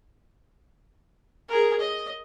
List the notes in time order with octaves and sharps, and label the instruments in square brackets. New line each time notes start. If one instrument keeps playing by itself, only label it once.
[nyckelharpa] G#4 A#4
D#5